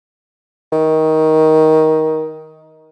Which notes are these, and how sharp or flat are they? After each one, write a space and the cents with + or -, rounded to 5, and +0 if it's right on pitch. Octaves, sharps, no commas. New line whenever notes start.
D#3 +15